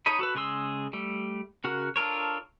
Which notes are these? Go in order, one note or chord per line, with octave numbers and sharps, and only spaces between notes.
D#4 A4 C#5 D#5 B5
F#4 A4 B4
C#3 G#3 G#4 C6 E6
G3 A3
C#3 F#4 A#4 F#5
D4 F4 A4 A#4 C#5